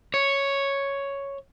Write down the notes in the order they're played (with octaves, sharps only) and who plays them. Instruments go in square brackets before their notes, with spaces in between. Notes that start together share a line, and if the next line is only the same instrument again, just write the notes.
[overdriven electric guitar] C#5